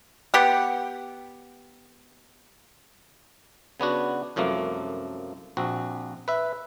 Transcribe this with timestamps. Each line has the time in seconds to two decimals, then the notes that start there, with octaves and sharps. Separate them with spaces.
0.34 B3 G4 F#5
3.80 C#3 B3 D4 F#4
4.36 C2 F#2 F3 A3 A#3
5.57 A#1 C4 F#4
6.28 B4 E5